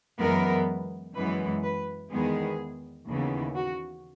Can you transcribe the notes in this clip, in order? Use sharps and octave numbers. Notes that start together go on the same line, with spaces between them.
F#2 E3 G#3 B3 A#4
F#2 E3 G#3 B3 B4
B4
E2 D#3 G#3 B3 G#4
D#2 C#3 E3 B3
F#4